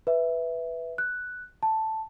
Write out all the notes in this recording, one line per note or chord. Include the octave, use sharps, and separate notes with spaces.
B4 E5
F#6
A5